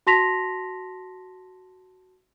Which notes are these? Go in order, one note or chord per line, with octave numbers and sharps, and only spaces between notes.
F#4 A5 C6 A#6 B6 F7